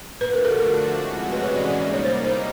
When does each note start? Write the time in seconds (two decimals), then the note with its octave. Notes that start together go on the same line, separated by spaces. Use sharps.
0.20 D3 F3 A3 D4 F#4 B4
0.33 A#4
0.45 A4
0.57 A#4
0.95 C3 E3 G#3 C#4 F#4
1.32 B4
1.43 C#5
1.56 D5
1.68 G3 A#3 D#4 D5
1.80 D5
1.93 C#5
2.05 C5
2.24 C5